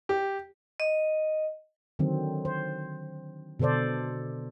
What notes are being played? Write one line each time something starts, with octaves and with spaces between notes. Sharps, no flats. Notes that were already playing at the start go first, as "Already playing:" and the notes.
G4
D#5
D3 D#3 F#3 C4
C5
B2 D3 A4 C5 D5